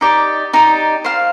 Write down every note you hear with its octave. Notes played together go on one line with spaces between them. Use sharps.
D#4 G4 D5
D#4 G4 D5
C5 F5 C6